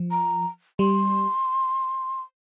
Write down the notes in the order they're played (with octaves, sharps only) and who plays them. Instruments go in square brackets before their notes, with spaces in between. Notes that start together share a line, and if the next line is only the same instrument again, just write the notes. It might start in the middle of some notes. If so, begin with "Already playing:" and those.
Already playing: [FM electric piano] F3
[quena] A#5
[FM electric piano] G3 [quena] C6